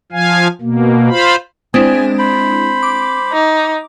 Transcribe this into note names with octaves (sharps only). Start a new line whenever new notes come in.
F3 F5 G#5
B2 A#3
F4 C5 F5 B5
G#3 C4 D4 E4 G#5
C5 B5
D6
D#4